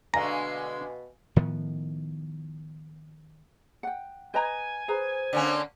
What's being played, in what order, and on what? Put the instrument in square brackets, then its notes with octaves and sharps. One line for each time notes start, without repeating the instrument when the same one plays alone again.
[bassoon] B2 [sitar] D3 G#3 A3 [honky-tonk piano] F5 G#5 [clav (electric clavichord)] A#5
[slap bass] A2 D#3 F3 B3
[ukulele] F#5 G5
[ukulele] B4 D#5 A#5 [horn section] G#5
[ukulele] G#4 B4 A#5 [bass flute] C5
[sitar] D3 A#3 C#4